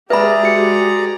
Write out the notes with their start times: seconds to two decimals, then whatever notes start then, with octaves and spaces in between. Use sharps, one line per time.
0.10 G#3 G4 G#4 B4 D5 E5 A#5 B5
0.43 F#4 C#7